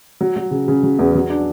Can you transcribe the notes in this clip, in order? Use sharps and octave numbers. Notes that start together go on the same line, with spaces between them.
F#3
F#3
C#3
C#3
F#3
E2
F#3
D4